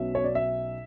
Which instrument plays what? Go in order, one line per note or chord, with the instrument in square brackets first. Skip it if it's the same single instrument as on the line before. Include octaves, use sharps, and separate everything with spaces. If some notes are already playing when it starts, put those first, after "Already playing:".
Already playing: [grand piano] B1 B2 F#3 C#4 E5
C#5
D5
E5